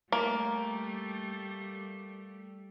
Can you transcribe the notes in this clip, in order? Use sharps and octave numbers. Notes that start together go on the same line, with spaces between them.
G3 A3 A#3